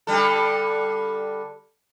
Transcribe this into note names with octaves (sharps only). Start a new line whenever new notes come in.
D3 G3 A4